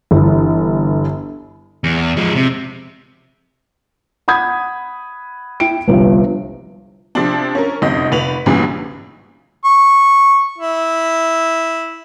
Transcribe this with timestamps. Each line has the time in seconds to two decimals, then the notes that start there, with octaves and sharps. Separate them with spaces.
0.11 G1 E3
1.84 E2
2.17 F3 G#3
2.35 C3
4.28 F#5 B5 D#6 G#6
5.60 E4 G5 D7
5.88 G1 C2 G2 F3
7.15 C3 F3 C4 D4
7.55 C#4 A#4
7.82 F1 C2 F#2 D#5
8.12 F1 B4 F7 F#7
8.46 B1 G2 A#2 C#3 E3
9.65 C#6
10.58 E4